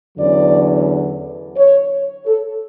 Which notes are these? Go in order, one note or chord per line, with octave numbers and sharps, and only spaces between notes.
E2 D3 F#3 C#4 D5
C#5
A4